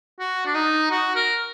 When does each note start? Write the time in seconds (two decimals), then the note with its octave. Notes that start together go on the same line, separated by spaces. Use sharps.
0.20 F#4
0.46 D4
0.55 D#4
0.91 F#4
1.15 A#4